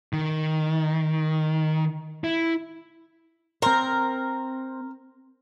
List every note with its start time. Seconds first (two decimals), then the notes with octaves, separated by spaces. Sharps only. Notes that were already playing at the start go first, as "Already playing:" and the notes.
0.13 D#3
2.24 E4
3.62 C4 A#4 C5